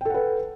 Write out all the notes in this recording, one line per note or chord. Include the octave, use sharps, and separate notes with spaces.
A4 B4 F#5 G5